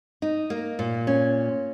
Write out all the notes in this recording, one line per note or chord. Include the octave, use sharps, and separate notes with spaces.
D#4
A#3
A#2
C#4